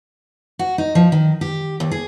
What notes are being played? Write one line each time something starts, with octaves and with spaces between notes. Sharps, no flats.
F#4
D#4
F3
D#3
G4
D#2
G#4